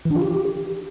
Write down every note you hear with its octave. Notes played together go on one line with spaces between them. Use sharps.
E3
D4
F4
G4